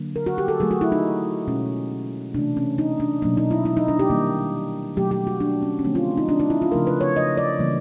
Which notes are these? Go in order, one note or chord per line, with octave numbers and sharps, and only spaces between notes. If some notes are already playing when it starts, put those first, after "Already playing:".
Already playing: D3 F#3 A#3
A#4
F#4
G4
A4
D3 F#3 A3 G#4
F#4
E4
D#4
B2 G#3 C#4
C3 E3 A3 D4
C#4
D#4
D4
B2 F#3 A#3 D4
D#4
E4
E4
D#4
D4
G4
D#3 G3 A#3
B2 F#3 A3 G4
G4
F#4
D4
C#4
C#4
D3 F3 A3 C4
F4
D#4
D4
D#4
E4
F4
C#3 F3 A3 A#4
B4
C#5
D#5
D5
C#3 E3 G3 A#3